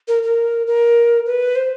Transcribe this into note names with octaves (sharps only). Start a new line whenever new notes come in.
A#4
A#4
A#4
B4
C5